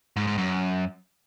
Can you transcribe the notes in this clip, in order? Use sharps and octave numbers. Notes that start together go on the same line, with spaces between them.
G#2
G#2
F#2